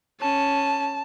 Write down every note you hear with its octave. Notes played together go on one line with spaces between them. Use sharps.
C#4 A5